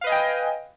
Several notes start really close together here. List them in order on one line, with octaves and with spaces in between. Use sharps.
F5 B4 D#5 G#5 G5